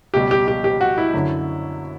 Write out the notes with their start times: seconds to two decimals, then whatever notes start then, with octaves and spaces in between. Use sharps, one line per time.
0.14 C#2 B2 G3 G4
0.31 G4
0.48 G4
0.64 G4
0.81 F#4
0.98 E4
1.14 F#2 D3 F#3